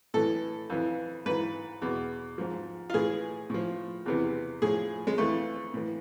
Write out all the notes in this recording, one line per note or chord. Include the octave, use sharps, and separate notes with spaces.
A2 E3 A4
F2 E3
G#2 E3 B4
E2 B2
G#2 F3
F4
A2 E3 G#4
A2 F3
E2 C3 E3
A2 F3 G#4
G#3
F2 E3 A3
A2 E3